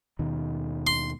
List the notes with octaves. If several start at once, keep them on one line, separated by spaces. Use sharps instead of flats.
D#2 B2 D#3
C6